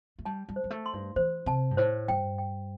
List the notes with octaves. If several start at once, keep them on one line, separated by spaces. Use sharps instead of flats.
A3
G3 A5
G3
C5
G3
A3
C6
G2
E3 C5
C3 A5
G2
A2 C5
G2 G5
G5